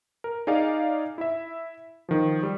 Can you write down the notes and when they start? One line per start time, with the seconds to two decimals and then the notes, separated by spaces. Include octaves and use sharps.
0.24 A#4
0.47 D#4 G#4 D5 F5
1.18 E4 E5
2.09 D#3 F3
2.43 G3